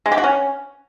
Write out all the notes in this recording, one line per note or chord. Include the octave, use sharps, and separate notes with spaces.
G#3
G4
F#4
C#4